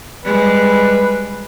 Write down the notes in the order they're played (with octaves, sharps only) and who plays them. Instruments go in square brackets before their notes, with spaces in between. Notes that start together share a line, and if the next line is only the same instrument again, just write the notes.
[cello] G3 G#3 [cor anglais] B4